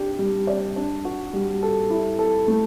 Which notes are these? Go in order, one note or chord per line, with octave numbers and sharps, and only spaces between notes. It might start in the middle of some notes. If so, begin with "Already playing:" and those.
Already playing: D4 G4
G3
D5
D4
F#4
G3
A4
E4
A4
A3